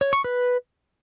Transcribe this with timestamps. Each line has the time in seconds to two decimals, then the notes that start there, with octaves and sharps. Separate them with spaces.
0.01 C#5
0.13 C#6
0.24 B4